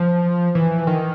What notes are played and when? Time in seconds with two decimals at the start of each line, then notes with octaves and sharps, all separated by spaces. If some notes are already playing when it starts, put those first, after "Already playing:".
Already playing: F3
0.55 E3
0.87 D#3